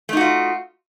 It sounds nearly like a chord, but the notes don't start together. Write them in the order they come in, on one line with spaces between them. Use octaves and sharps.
A3 D#4 F#4 F4